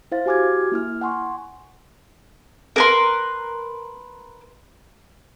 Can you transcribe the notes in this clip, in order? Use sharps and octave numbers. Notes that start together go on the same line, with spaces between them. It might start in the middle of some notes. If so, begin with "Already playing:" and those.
E4 C5 F5 A6
F#4 G4 G#5 D6 F6 G#6
A#3 E4 F6
F#5 G#5 C6 C#6
A#4 B4 C6